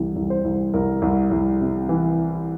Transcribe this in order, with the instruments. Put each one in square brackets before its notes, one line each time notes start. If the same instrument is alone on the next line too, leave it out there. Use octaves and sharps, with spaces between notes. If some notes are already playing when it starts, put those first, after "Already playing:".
Already playing: [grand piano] C2 C3 E3
C2
C5
C2
C2 A#4
C2
C2
C3
E3